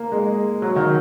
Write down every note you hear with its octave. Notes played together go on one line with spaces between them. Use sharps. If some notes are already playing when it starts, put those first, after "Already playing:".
Already playing: A#3
G#3
F#3
D#3